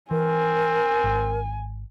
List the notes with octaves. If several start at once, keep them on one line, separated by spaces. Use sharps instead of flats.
E3 C4 A#4 G#5
G#1